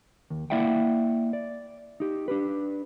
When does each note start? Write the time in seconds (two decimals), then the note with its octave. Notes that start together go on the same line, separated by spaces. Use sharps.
0.30 D#2
0.50 A#3 E4 D5 E5 F#5 G5
1.33 D5
2.00 D#4 G4
2.28 D4 G4 B4